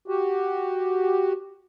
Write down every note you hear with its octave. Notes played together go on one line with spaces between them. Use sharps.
F#4 G4